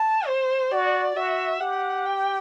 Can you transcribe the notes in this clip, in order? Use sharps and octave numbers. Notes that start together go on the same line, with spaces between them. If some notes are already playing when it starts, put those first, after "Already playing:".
Already playing: A5
C5
F#4 D5
F#4 E5
G4 F#5
G5